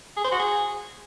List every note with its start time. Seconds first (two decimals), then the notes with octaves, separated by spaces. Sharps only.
0.17 G#4
0.24 C5
0.32 F#4
0.39 G#4